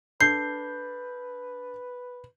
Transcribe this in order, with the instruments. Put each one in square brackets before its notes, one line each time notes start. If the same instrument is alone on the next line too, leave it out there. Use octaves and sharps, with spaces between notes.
[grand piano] D4 A4 [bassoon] B4 [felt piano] G6 [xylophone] C7